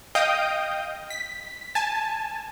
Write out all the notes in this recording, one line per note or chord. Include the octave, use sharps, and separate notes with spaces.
D#5 F5 G5 D#6 G6
B6
G#5 A5